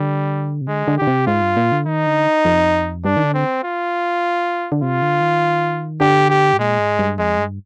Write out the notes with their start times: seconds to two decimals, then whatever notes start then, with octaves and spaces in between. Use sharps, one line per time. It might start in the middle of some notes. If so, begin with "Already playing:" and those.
Already playing: D3 G3
0.61 C3
0.67 D3 G#3
0.88 D3
0.98 D3 G4
1.07 C3
1.27 G#2 F4
1.42 G2
1.57 A#2
1.72 D3
1.86 D#3 D#4
2.07 D3
2.45 F2
3.05 G2 D4
3.17 D#3
3.24 D3
3.34 C4
3.64 F4
4.72 D3
4.82 C3 F4
5.02 D3
5.21 D#3
6.01 D3 G4
6.30 G4
6.53 G#2
6.59 A#2 G#3
6.79 G#2
6.99 G2
7.19 F2 G#3
7.38 G2